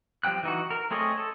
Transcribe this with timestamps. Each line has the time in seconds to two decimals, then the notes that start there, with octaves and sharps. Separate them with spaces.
0.23 F3 G3 C4 G5 F#6
0.43 E3 D#4 F#4
0.70 A#4
0.91 A3 C4 G#4 C#5 D#5
1.18 A4